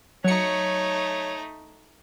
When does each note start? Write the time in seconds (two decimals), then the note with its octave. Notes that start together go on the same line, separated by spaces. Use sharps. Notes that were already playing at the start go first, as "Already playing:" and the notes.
0.24 F#3 A3 D#4 C#5 C#7